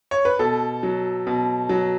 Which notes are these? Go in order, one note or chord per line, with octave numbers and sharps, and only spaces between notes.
C#5
B4
B2 A4
F#3
B2
F#3